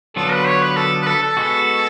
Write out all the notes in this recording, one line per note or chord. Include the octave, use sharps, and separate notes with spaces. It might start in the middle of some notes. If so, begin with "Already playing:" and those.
D3 F#3 B3 F4 A4
B4
C#5
B4
A4
B4
A4
A4
G#3 B3 F#4